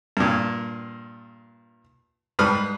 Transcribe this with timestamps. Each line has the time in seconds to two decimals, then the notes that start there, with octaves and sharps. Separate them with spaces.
0.17 G2 A#2
2.39 G#2 G3 B4 D#6 F6